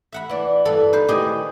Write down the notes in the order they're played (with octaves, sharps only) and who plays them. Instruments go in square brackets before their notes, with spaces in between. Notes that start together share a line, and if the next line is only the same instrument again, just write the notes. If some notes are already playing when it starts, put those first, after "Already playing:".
[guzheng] E5 F#5 B5
[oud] E3 D4
[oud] G2 E3 [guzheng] A4
[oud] D#4 [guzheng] B4 C5
[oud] D2 D#3 E3 [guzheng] G4 G#4 D#5